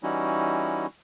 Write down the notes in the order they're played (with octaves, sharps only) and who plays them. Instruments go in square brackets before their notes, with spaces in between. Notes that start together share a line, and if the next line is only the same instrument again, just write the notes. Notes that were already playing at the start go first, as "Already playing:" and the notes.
[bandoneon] E3 G3 C#4 D#4 E4 F#4